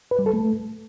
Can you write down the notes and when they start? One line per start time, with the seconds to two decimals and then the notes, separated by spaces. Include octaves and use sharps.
0.11 B4
0.19 G3
0.26 A4
0.34 A3